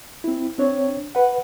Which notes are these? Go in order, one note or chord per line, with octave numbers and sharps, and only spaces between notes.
C4 E4
C4 D4 C#5
B4 F#5